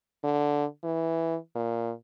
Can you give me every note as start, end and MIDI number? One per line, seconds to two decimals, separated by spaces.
0.24 0.65 50
0.83 1.36 52
1.55 1.91 46